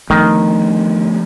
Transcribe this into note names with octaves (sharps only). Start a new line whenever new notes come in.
D#3 F3 A3 B3